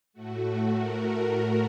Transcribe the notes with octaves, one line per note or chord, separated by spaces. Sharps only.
A2 A3 F#4
A#4